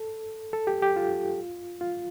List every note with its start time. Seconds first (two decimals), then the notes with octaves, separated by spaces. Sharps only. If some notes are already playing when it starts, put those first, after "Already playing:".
Already playing: A4
0.53 A4
0.67 G4
0.82 G4
0.96 F4
1.81 F4